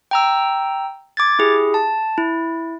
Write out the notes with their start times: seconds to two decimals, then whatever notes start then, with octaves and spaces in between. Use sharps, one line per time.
0.11 G5 A#5 E6
1.17 D6 G#6 A6
1.39 E4 G4 G#4
1.74 A5
2.18 E4